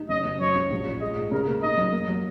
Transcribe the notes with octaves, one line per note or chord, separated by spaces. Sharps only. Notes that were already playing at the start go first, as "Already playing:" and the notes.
Already playing: D#4
F#1 D#5
F#1
F#3 C#5
C#2
A#1
A#2
G#3 D#5
G#2
C#3 A#4
A#3
D#4 D#5
F#2
A#3
F#3